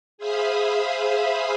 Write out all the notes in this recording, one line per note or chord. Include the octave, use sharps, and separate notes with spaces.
G#4 C5 E5 F5 B5 D#6